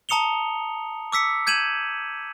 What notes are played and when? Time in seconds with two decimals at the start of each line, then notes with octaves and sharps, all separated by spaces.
0.09 A5 A#5 D#6 C#7 F7 G7
1.12 D6 E6 B6 C#7
1.47 G6 G#6 D#7 E7 F#7